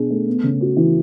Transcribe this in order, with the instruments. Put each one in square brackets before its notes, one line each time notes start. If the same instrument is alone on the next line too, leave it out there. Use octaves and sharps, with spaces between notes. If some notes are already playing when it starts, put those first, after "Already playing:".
Already playing: [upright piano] B2 D4 G#4
A3
B3
C#3
F#4
E3